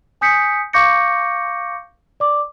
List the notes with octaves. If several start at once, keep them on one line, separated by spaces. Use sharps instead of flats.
G#5 D#6 G6 B6 C#7
F5 C#6 D6 G6 A#6 C#7
D5 D6